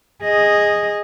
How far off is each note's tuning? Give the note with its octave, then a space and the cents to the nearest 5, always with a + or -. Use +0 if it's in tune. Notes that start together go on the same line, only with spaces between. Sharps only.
G#4 -10 D#5 +0